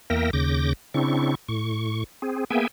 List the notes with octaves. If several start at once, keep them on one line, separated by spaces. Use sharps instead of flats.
E2 A#3 A#4 E5 G5 A#6
D#2 C#3 D6 G6 A#6
C#3 C4 D4 E4 C#6
A2 C#6
C4 G#4
A#3 B3 G#4 E5 G5 G#5